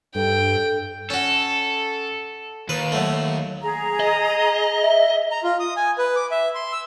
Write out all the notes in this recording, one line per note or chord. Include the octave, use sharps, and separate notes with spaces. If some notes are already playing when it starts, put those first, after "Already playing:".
G2 A4 G5
C#4 F#4 A4
D#2 B4
F#3 A3
G#4 A#5
D#5
E5
A#5
F4
D#6
G#5
B4
D6
E5
C6
E6